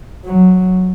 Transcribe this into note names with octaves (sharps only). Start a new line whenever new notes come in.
F#3